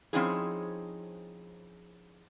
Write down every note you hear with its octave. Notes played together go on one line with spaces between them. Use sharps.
F3 C4 C#4 D#4 E4 G#4